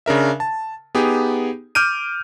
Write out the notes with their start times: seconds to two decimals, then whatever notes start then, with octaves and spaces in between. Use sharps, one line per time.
0.06 C#3 D4 A#4 E5
0.40 A5
0.95 B3 D#4 G4 G#4
1.75 D6 F6 G6 D7 D#7